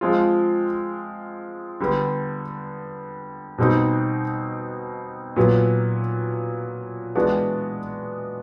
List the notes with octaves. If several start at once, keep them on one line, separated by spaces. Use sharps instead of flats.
F3 G#3 C4 F4
D3 G3 B3
B2 G3 C4 D#4 F#4
A#2 F#3 B3
E3 G#3 B3 D4 F#4